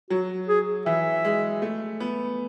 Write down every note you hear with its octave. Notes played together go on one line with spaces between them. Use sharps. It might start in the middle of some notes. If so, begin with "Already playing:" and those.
F#3 F#4
G#4
E3 E5
G#3
A3
B3